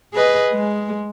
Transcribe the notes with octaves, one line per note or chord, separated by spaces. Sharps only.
G#4 B4 D#5
G#3